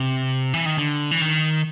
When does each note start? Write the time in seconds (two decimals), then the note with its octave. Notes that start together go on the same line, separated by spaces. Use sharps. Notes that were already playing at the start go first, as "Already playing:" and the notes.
Already playing: C3
0.53 E3
0.66 D#3
0.77 D3
1.11 E3
1.21 D#3